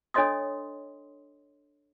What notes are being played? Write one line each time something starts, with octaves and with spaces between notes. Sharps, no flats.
D4 A4 C#5 D#5 C6 D#6